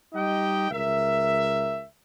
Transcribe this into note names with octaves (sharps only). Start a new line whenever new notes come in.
G3 D#4 G4 D#5 G5
C#2 A#4 E5